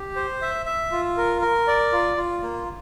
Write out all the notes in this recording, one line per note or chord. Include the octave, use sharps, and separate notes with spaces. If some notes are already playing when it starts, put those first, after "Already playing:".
Already playing: G4
C5
E5
E5
F4
A#4
A#4
D5
F4
F4
A#3